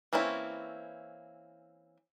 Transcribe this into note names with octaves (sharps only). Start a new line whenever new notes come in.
E3 A#3 C4 C#4 E4